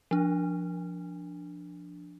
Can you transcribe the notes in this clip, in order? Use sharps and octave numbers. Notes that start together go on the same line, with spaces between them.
F3 D4